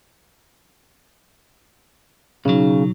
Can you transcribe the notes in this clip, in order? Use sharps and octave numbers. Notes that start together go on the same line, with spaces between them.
B1 C#3 F#3 D#4